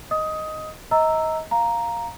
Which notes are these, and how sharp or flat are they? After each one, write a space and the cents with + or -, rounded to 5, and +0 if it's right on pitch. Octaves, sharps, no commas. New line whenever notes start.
D#5 +0 D#6 +15
D#5 +30 A#5 -10 E6 +0
F5 +0 A#5 +0